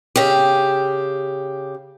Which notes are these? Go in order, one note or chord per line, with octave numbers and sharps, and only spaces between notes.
C#3 G4